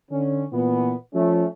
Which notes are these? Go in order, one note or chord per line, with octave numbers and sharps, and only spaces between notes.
D3 C#4
A#2 E3 B3
F3 A3 C#4